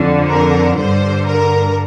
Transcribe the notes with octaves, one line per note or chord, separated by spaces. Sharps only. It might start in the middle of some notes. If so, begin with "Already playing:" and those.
Already playing: F2 D3
A#4
G2 D3 C5
A#4